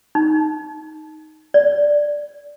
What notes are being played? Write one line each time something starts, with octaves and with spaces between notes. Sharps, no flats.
D#4
D5